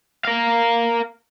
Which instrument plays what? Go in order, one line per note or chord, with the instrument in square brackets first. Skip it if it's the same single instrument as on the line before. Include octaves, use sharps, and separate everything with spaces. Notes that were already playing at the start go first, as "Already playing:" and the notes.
[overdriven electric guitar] A#4 F5